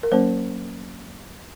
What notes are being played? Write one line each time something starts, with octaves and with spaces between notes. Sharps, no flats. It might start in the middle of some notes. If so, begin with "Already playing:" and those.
A#4
F#3 A#3 C#4 C5